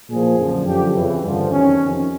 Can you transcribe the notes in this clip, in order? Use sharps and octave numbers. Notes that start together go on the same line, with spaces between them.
A#2 F3 G#4
F#2 D3 F3
F#2 D3 F3 G4
F2 C#3 E3
G2 D3 F3
E2 C3 D#3 C#4
F2 C3 D#3